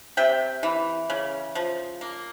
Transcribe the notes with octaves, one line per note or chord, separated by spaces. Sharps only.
C3 E5 G5
E3
C#3
F3
A#3